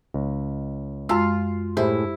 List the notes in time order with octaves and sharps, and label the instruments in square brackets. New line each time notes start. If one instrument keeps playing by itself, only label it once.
[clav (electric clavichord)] C#2
[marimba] F#2 G#3 E6 [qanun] F4
[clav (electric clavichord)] A2 G#4 [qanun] E4 [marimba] G4 C5